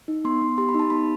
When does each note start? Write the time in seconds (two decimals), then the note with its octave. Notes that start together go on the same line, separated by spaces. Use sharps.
0.08 D#4
0.25 B3 C6
0.42 B3
0.58 G4 C6
0.69 B5
0.74 D#4
0.79 A5
0.90 B3 B5